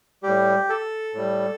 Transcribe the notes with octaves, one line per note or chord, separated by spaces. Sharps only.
A2 G3 G4
A4
A2 G3